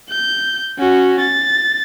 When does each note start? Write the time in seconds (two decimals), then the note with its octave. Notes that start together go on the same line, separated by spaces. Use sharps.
0.10 G6
0.78 C#4 F#4
1.20 A6